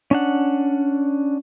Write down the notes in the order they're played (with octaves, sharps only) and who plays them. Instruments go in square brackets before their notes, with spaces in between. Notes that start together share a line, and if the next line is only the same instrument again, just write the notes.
[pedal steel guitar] C#4 D4 F#5